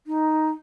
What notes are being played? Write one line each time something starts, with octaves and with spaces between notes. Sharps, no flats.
D#4